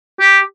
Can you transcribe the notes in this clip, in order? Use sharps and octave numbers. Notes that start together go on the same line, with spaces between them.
G4